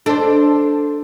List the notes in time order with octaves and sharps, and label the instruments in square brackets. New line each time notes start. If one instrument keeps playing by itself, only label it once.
[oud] D4 [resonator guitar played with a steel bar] A4 C5